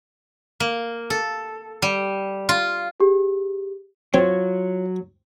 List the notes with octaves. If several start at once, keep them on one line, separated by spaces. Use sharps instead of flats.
A#3
A4
G3
F4
G4 G#4
F#3 C4 F4 C#5